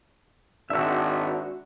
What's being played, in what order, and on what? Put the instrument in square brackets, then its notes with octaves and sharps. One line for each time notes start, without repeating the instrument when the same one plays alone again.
[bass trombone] G#1 [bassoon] D4 [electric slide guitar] F#4 E5